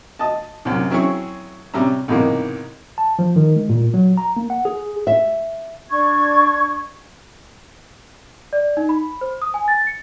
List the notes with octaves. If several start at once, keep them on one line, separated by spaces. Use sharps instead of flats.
D#5 A5
C2 F#2 C3
F#3 C4 C#4 E4 G#4 C#5
C3 G3 C#4 E5 A#5
B1 G#2 C3 E3 A#3
A5
F3
D#3
G#3
A#2
F#3
A#5
A#3
F#5
G#4
E5
D4 C#6 G#6
D5
D#4
B5
C5
D#6
G#5
A6
C#7